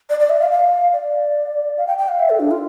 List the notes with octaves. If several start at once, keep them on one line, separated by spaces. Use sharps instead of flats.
D5
D5
E5
F5
F5
D5
F5
G5
G5
F5
E5
A4
D4
F4